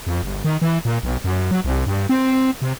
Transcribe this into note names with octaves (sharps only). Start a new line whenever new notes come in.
F2
G1
D#3
E3
A#2
B1
F#2
F#3
C2
G2
C4
C3